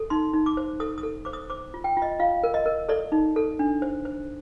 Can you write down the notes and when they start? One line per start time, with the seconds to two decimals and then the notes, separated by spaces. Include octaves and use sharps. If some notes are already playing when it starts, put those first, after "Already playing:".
Already playing: A4
0.10 D#4 C6
0.34 D#4
0.46 D6
0.57 C5
0.80 A4 D#6
0.98 D#6
1.03 A4
1.25 C5 D6
1.33 D#6
1.50 C5 D6
1.74 F4
1.84 G5
1.97 F4
2.02 D#5
2.20 F4 F5
2.43 A#4
2.54 D#5
2.66 A#4
2.89 A4 D5
3.12 D#4
3.36 A4
3.59 D4
3.82 C5
4.05 C5